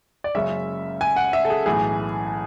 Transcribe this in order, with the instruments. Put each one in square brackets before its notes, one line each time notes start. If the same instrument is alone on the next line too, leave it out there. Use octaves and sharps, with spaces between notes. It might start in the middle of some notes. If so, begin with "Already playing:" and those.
[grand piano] D5
F#1 F#2 C#3 G#3 C#4 E5
G#5
F#5
E5
A4
G#4
B1 A2 E3 G#4